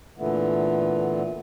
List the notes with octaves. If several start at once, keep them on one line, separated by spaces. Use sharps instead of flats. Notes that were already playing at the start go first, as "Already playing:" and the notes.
A#2 D3 E3 A3 B3